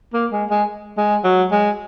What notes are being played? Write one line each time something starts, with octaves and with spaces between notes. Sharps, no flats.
A#3
G#3
G#3
G#3
F#3
G#3